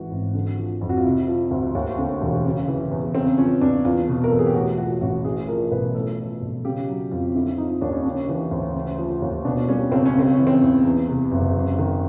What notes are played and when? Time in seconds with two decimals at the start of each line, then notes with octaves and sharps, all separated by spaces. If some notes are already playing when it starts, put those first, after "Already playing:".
Already playing: A1 G#2 E3 F#4
0.11 G#1
0.34 D3
0.58 F3
0.81 F2
0.89 F#4
0.97 F4
1.04 C3 E4
1.28 F3 F4
1.51 D2 F#4
1.75 D#2
1.98 D3
2.21 E1
2.45 C#3
2.68 E3
2.91 E2
3.15 C#3 C4
3.38 F3 C#4
3.61 E2 D4
3.85 E2 F4
4.08 B2
4.24 A#4
4.31 E1 A4
4.39 G#4
4.47 G4
4.54 A2 F#4
4.78 F3 F#4
5.01 A1 F#4
5.24 A2 G#4
5.48 F3 A#4
5.72 B1 B4
5.95 A2 A4
6.18 F3
6.41 B1
6.65 C#3 G4
6.88 F#3
7.11 F2 F4
7.35 D3 E4
7.58 F3 D#4
7.81 D#2 D4
7.92 C#4
8.02 C#3 D4
8.28 E3
8.51 D2
8.75 C#3
8.98 F3
9.22 D#2
9.45 B2 D4
9.68 G3 C#4
9.91 C#2 C4
10.05 C#4
10.15 C#3 C4
10.33 C#4
10.38 E3
10.47 C4
10.62 E2
10.85 E2
11.08 C3
11.32 F#1
11.55 F#2
11.79 D#3